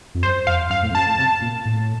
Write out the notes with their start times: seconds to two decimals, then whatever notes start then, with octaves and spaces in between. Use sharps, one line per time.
0.15 F2
0.22 F#2 C5
0.47 F2 F5
0.70 F#2 F5
0.83 A2
0.90 F2
0.95 F#2 A5
1.07 A2
1.18 C3
1.42 A#2
1.65 A2